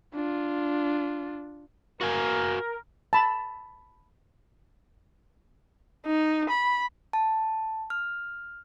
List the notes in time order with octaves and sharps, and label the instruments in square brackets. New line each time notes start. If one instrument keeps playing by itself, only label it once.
[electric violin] D4 F4
[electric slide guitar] F#4 F5 G#5 [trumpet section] A#4
[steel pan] A5 B5
[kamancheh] D#4
B5
[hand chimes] A5
F6